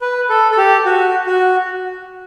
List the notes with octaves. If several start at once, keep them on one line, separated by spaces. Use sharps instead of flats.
B4
A4
A4
G4
F#4
F#4